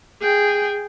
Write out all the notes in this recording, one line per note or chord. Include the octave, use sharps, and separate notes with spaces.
G#4 G5